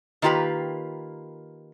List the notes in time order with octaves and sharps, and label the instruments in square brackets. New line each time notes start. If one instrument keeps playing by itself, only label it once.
[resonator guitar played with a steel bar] D#3 A#3 F4 G4 B4